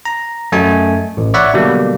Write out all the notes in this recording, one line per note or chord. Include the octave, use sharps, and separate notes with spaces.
A#5
F#2 A3 D#5 G#5
A1
C#5 D5 E5 F#5 B5
B2 D3 F#3 G3 A#3